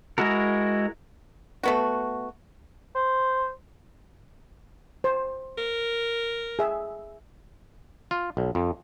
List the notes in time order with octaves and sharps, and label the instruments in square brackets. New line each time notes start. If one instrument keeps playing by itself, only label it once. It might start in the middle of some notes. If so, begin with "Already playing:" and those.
[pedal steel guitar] G#3 E4 F#4 A#4
[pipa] A3 B3 F#4
[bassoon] C5
[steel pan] C5
[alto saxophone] A#4
[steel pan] G#4 E5
[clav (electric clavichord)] F4
B1
F2